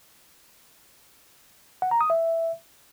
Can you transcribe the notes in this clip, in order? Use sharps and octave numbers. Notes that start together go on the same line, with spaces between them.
F#5
A#5
D#6
E5